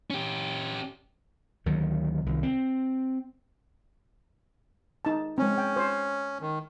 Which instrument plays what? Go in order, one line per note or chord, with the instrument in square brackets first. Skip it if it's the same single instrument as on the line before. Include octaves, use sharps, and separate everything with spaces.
[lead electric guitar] C#4 G4
[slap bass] D2 D#3 F#3
C2 D#3
C4
[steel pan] D#4 A5
[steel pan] G#3 C4 [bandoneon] C#4
[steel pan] G5
C5
[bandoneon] D#3